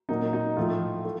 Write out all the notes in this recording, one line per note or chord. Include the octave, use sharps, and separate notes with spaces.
A#2 F#3 A#3 D#4
D#4
A2 F3 A3 F4
A3